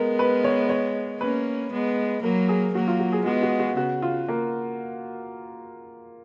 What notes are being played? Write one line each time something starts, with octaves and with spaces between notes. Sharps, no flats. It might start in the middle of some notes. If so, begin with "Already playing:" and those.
Already playing: G#3 B3 A#4
B4
C#5
C#5
A#3 C#4 B4
G#3 B3
F#3 A#3 A#4
G#4
F#3 A#3 F#4
F4
F#4
G#4
G#3 B3 F#4
F#4
F#4
C#3 F#4
F4
A#3